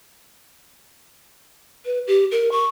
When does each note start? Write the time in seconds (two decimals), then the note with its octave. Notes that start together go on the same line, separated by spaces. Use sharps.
1.86 B4
2.07 G4
2.31 A#4
2.52 C#6